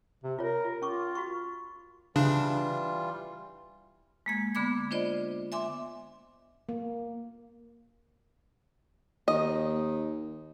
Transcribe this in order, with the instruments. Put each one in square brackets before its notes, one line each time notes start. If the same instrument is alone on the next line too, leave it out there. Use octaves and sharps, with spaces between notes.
[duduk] C3
[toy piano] F4 C#5 [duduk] A#4
[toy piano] F4
[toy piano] C#4 C#6 D6 [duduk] F4
[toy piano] F#4 B5 C#6
[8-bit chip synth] C#3 D4 [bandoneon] E3 G3 F4
[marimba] G#3 A#3 G#6
D3 B3 B5 D6 G#6
D4 F4 C5 D5 D#5
E5 G#5 C6 D6
[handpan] A#3
[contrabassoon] D#2 [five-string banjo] D#5